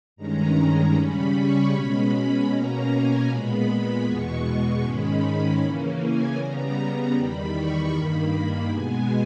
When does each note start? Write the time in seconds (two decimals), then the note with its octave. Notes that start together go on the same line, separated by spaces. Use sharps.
0.16 G2 D#3 G#3 C#4 A#5
0.94 C#3 G3 C#4 B5
1.33 C#6
1.72 B2 G#3 C#4 B5
2.11 B5
2.49 B2 A#3 C#4 A#5
2.89 G#5
3.27 A#2 G#3 B3 B5
3.66 B5
4.04 E2 B2 G#3 B3 C#6
4.82 G#2 D#3 G#3 C#4 B5
5.59 C#3 E3 A#3 C#4
5.98 G#5
6.37 C#3 G3 B3 A#5
7.15 E2 D#3 G3 B5
7.54 C#6
7.92 G2 D#3 A#3 B5
8.69 B2 G#3 B3 G#5